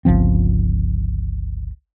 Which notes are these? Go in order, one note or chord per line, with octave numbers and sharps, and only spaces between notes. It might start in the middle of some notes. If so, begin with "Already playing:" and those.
G1 C#2 F3 C4